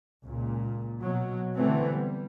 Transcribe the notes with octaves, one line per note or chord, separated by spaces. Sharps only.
C#2 A#2
B2 F#3
D3 E3 A3 B3 C4
G3